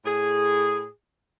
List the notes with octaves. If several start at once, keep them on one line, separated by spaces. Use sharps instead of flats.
A2 G#4